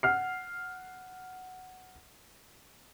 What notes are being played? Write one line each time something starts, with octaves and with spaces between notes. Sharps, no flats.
F#5 F6 C7